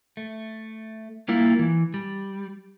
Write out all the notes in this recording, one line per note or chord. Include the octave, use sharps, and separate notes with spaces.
A3
G3 A#3 E4 F4
E3
G3